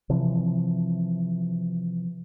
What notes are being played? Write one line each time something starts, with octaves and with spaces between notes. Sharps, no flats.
C3 E3 F3